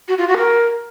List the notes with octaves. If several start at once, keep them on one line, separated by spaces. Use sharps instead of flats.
F#4
F4
F#4
A#4